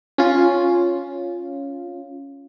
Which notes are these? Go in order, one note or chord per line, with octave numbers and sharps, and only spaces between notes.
C#4 F4